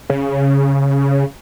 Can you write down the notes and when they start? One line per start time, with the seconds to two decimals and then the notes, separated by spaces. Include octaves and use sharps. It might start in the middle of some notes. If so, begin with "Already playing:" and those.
0.10 C#3